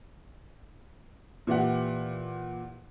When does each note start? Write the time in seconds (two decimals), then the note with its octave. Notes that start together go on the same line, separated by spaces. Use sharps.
1.47 A#2 E3 G4 F#5